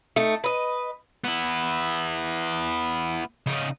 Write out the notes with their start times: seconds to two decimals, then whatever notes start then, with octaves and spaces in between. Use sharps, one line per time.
0.16 A3 D#4
0.44 B4 D#5
1.24 B3 E4
3.46 C#3 D#4